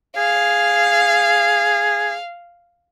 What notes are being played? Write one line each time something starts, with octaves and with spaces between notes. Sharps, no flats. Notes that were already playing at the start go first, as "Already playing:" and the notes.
G#4 F5